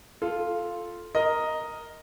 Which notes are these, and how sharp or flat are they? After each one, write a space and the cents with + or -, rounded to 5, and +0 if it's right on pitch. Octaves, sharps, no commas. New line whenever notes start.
F4 +0 A4 -10
A#4 +0 D#5 +0